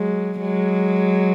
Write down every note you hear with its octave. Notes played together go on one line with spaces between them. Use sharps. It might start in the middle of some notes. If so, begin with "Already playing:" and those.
Already playing: F#3 G#3
F#3 G#3